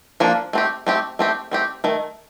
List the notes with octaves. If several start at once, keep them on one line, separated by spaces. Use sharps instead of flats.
F3 A#3 D4
A3 C4 G4
A3 C4 G4
A3 C4 G4
A3 C4 G4
D#3 A3